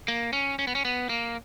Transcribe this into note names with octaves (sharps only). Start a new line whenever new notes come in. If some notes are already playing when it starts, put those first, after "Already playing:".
A#3
C#4
C#4
B3
C#4
B3
A#3